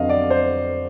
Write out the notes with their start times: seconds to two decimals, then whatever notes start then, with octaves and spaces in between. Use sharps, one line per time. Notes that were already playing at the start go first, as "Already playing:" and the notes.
Already playing: F2 D3 F#3 B3 D#5 F5
0.09 D5
0.30 C5